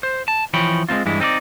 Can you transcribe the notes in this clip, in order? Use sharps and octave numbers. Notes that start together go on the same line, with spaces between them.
C5
A5
E3 F3 C#5 G5 B5
G#3 A#3 C4 F4
G2 E3 G#3 E4
C4 D#4 A4 D5